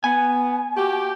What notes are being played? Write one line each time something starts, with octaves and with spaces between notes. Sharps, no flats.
B3 G#5
A#3 F#4 G4